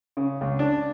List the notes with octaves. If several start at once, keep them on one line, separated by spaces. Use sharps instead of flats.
C#3
C#2
D4